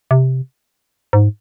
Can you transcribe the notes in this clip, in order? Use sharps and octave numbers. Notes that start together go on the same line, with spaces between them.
C3
G#2